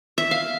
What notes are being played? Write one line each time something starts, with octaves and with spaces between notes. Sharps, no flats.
E5
F5